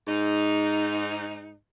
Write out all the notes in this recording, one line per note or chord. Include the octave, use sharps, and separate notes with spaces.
G#2 D#4